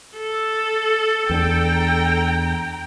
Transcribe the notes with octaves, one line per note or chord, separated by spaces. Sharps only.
A4
E2 A#3 D4 G5 A#5